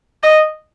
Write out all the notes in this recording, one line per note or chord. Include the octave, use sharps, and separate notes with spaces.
D#5